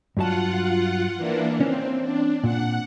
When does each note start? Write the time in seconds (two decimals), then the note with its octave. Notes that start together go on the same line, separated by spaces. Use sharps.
0.17 G2 F#3 F4 F#5 A5
1.17 E3 A#3 D4
1.61 C4 C#4
2.02 D4
2.44 A#2 F#5